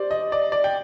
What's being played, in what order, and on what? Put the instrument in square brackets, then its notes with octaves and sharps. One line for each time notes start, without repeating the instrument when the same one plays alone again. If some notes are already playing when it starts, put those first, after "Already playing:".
Already playing: [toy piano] G4 [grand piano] C5 D5
[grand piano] D#5
D5
D5
G5